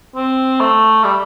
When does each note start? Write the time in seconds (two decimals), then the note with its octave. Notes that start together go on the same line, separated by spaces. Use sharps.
0.15 C4
0.61 A3
1.04 G3